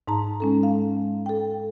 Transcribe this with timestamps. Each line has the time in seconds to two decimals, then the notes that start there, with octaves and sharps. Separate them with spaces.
0.08 G#2 D#4 A5 A#5
0.40 G#3 C#4 A4
0.63 F5
1.26 A4 G5